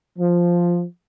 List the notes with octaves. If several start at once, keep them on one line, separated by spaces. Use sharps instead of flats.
F3